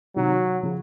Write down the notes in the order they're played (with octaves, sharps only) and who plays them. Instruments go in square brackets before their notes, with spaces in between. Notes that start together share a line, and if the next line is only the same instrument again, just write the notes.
[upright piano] C3 D#3 [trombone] F#3
[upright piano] C#3 F3